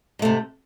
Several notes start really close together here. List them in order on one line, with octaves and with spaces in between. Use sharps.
G#2 A3 C3